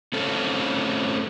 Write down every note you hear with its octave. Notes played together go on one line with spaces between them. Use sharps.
A3 C4 C#4 A4